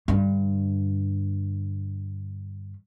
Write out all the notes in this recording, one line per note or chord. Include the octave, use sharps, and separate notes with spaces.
G2 D3